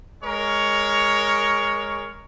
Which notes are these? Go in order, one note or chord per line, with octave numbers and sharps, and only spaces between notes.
G#3 A#4 C#5